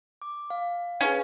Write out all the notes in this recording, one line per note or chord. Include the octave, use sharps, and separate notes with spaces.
D6
F5
C#4 G#4 B4 F5